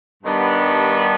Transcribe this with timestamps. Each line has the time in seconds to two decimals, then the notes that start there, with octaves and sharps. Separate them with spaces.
0.23 G2 D#3 G3 B3 D4